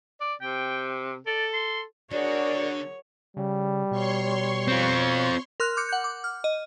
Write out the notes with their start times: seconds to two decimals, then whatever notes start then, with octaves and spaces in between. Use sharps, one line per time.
0.20 D5
0.41 C3 G5
1.26 A4 D5
1.53 C6
2.12 D3 F#4 G#4 A#4 C#5 D5
3.37 C#3 G3
3.91 B2 C#5 C6 C#6
4.68 C4 F4
5.60 A#4 C6 F6 F#6
5.77 D6 F#6 G6 C#7
5.89 F#5 G6
6.04 D6
6.24 F6
6.44 D#5